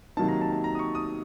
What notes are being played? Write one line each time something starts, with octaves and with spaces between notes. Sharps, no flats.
C3 D#3 F#3 A#3 D#4 A5
A#5
A5
A5
A#5
D#6
C#6
D#6